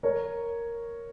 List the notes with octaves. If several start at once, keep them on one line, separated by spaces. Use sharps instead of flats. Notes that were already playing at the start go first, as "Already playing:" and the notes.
A#4 C#5